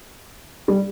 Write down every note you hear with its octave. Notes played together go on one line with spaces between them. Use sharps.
G3